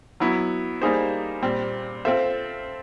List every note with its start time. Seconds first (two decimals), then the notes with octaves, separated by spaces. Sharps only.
0.20 F#3 B3 E4
0.82 G3 A#3 D#4 G#4 C5
1.42 A#2 G3 C4
2.05 C4 F4 A4 C5 E5